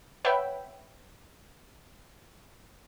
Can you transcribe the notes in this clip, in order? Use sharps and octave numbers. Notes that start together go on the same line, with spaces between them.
B4 C#5 E5 F#5 G5 B5